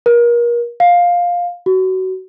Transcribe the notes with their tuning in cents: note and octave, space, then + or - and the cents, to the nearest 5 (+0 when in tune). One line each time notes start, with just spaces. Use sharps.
A#4 +30
F5 +10
F#4 +20